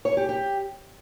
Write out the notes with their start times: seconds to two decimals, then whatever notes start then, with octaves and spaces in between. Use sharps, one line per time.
0.05 C#5
0.17 G4
0.29 G4